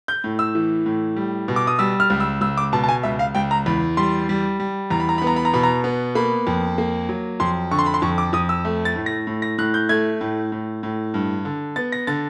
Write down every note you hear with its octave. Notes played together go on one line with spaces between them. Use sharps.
G6
A2
E6
E3
A2
G3
B2
D6
D#6
G3 E6
F6
C#2
E6
C#2 E6
D6
B2 A5
A5
G#5
C#2 E5
F5
C#2 G5
A#5
E2 B5
G3 C6
G3
G3
E2 A#5
B5
A#5
B3 B5
A#5
B5
A#5
B2 B5
A#5
B3
A#3 B5
F2
A#3
F#3
F2 C6
D3 C#6
C6
B5
C6
F2 C#6
D6
F2 D#6
E6
A3
A6
A2
A#6
A2
A#6
A2 F#6
G6
A3 G#6
A2
A2
A2
G2
D3
B3 A6
A#6
D3 A6